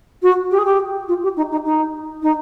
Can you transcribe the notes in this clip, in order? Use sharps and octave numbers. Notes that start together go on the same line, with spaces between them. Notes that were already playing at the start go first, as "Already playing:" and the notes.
F#4
G4
G#4
G4
F4
G4
D#4
D#4
D#4
D#4